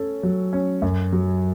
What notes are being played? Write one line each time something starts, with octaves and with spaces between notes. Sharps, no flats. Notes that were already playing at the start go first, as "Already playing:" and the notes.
Already playing: C#4 A4
F#3
C#4
F#2
F#3